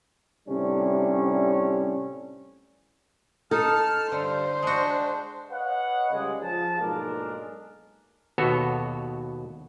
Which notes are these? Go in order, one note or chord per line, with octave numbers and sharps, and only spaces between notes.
A2 C3 G3 C#4 D4
D#4 A4 A5 F6
G2 D3 C5
G#3 D4 F#4
B4 C#5 D#5 F5 F#5
C#2 C#3 G3 G#3
F3 G#4 A5
B1 G#2 G#3 A#3 D4 A#4
D#2 B2 B3 F#4 A4 C#5